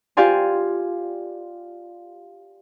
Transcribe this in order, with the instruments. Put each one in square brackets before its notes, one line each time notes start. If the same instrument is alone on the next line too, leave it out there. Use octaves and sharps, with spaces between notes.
[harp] F4 G4 D5 F5 G#5 C6